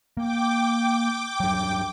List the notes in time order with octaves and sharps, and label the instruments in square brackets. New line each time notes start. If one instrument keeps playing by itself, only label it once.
[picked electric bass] A#3 [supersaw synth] G5 D6
[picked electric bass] G2 F#3